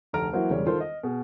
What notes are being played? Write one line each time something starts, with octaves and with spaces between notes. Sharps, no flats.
F1 D2 A4 A#5 F6 D7
E3 F#3 A#3 E4 F#4 C5
E1 C#3 G3 C#5
D#3 F4 A4 C5
D#5
B2 G#4